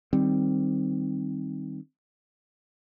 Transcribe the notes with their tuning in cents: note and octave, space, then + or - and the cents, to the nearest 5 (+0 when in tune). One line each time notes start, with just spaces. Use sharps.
D#3 -5 G3 +0 C4 +0